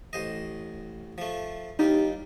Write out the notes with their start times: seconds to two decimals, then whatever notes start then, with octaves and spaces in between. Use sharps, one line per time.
0.13 A1 C5 D#5
1.18 F3 A3
1.79 D#2 G3 D#4 F4